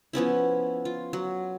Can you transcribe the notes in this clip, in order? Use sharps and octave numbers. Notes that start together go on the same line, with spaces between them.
F3 B3 C#4 E4
F4
F#3